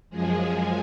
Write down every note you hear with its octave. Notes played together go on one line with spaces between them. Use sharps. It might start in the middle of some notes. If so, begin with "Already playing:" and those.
F#2 F3 G#3 G#4